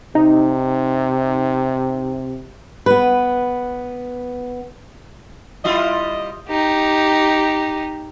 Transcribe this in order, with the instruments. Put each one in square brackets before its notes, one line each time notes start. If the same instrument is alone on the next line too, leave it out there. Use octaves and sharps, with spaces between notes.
[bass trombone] C3 [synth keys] D#4
[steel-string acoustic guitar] B3 B4
[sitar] G3 E4 F4 [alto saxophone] D#5
[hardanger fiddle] D#4 G4